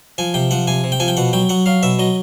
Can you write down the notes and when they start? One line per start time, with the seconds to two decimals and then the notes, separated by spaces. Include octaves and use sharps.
0.18 F3 G#5
0.34 C3 G5
0.51 F3 F#5
0.67 C3 G#5
0.84 C3
0.92 G5
1.00 F3 G#5
1.08 G5
1.17 B2 F#5
1.33 F#3 G5
1.49 F#3 F#5
1.66 F#3 F5
1.83 B2 E5
1.99 F#3 D#5